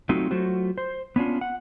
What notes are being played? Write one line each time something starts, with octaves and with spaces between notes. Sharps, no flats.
F#3 A3 C4 D#4 F4 F#4
F#3 A3 F4 F#4 C5
C5
B3 C#4 D4 F4
F#5